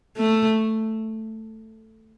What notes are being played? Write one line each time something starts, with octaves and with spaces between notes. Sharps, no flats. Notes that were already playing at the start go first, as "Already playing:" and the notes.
A3